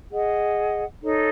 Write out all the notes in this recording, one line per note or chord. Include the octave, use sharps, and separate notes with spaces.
G#4 D#5 F#5
D#4 A4 C#5